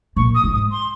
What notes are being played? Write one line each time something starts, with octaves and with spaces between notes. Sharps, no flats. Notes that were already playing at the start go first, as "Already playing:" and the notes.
A#2 C#6
D#6
G#2
D#6
C6